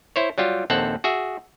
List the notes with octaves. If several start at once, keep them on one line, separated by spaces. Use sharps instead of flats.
E4 C5 C#5
F#3 G3 F4 G4
A#1 D#2 C4 A4 F#5
F#4 G#4 E5